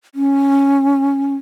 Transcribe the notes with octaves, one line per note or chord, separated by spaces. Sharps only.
C#4